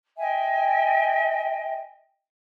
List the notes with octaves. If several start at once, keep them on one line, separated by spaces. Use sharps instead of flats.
D#5 E5 G5 G#5